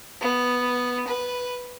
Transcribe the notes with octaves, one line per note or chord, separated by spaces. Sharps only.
B3
B4